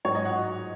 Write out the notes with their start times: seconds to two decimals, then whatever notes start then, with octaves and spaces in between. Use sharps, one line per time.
0.05 G#2 F#3 C#5
0.15 D#5
0.25 F#5